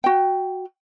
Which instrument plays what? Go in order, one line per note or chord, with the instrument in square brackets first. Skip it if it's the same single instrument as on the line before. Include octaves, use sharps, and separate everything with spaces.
[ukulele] F#4 G5